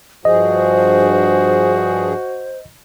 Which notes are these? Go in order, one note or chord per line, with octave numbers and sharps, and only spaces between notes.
G2 F3 F#4 G#4 C5 D#5